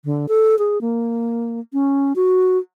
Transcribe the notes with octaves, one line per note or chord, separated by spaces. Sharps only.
D3
A4
G#4
A#3
C#4
F#4